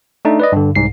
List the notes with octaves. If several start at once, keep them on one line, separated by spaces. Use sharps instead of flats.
A3 D4 D#4
B4 D5 D#5
G2 D3
C2 G#2 C7